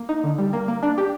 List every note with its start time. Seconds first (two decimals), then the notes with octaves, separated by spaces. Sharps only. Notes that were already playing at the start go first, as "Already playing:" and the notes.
Already playing: A#3
0.09 D#4
0.24 D3
0.38 G3
0.53 A#3
0.68 A#3
0.83 D4
0.98 G4